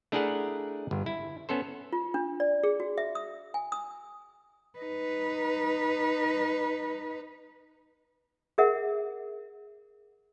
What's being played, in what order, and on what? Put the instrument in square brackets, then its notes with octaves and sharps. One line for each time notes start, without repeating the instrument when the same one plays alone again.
[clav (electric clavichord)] A3 D4 E4 G#4 A#4 F#5
G1
E4
B3 C#4 A4 C5
[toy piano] F4
D4
D5
G#4
F#4
E5
D#6
G#5
D#6
[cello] D#4 B4
[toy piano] G#4 A#4 E5 F#5